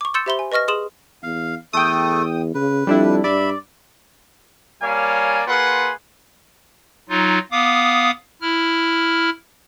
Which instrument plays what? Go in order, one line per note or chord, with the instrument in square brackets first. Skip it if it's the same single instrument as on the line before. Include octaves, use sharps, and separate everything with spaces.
[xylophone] C#6 D6
C6 E6 G6 A6 C#7 E7
G4 C5 E5 B5 C6 G7
G#5
B4 D#5 C#6 F6 A#6
G#4 C6 D#6 E7 F#7
[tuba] E2 [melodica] F5
[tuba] E2 [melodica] A3 A4 [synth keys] G5 D#6
[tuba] C#3 [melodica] B4
[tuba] F2 [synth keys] G3 D4 E4
[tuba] G2 [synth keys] D5 [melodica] E5 B5
[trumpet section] G3 A#3 C#5 D5 F5 G#5
A#3 F4 G#4 B4 F#5 C6
[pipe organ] F#3 D#4 F4
B3 F5 D6 D#6
E4 F6